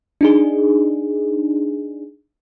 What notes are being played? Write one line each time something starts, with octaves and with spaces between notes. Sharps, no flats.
D4 D#4 G#4